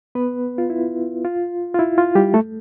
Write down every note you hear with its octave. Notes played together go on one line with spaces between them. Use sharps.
B3 B4
F4
E4
F4
F4
E4
F4
G3 G4
A3 A4